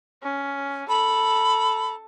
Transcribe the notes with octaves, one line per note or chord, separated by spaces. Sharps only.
C#4
A4 B5